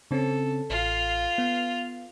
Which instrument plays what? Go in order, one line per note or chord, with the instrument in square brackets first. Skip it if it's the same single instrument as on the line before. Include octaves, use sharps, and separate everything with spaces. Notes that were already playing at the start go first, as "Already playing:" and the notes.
[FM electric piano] C#3 C4 C#4 [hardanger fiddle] A4
[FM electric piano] A1 [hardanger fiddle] F4 F5
[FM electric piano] B3